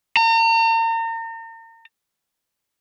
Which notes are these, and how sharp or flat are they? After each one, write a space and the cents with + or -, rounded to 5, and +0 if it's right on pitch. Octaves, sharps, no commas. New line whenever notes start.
A#5 -40